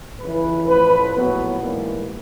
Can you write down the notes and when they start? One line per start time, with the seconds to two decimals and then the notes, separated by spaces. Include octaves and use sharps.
0.20 F2 C#3 E3 B4
0.67 A1 A2 F3 B4
1.14 A#1 A2 F#3 B3
1.61 A#1 G#2 E3 G3 A#3